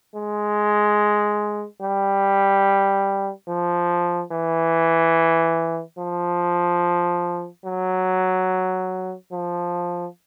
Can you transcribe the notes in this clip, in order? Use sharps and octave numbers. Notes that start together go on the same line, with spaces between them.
G#3
G3
F3
E3
F3
F#3
F3